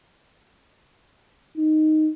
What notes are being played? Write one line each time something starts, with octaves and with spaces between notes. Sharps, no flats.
D#4